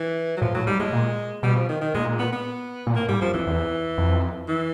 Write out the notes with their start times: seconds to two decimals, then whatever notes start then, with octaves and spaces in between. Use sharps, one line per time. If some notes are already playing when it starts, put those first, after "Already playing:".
Already playing: E3
0.37 F#3
0.42 A2 F3
0.55 A2 F#3
0.67 G#2 G3
0.80 A2 G#3
0.93 A#2
1.43 B2 G3
1.56 F3
1.69 D#3
1.81 D#3
1.94 A#2 G#3
2.19 B3
2.32 B3
2.87 A#2
2.96 A2 A#3
3.08 G#2 G3
3.21 F#2 F3
3.34 F2 E3
3.47 E2
3.98 F2
4.48 E3